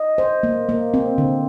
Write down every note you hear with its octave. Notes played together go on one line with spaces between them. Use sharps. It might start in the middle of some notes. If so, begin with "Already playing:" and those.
Already playing: D#5
C5
A#3
A#3
C4
D3